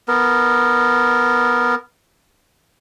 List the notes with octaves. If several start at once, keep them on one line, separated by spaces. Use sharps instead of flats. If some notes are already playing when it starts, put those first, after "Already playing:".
B3 A#4